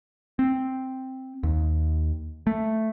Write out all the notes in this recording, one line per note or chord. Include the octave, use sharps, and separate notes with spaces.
C4
D#2
A3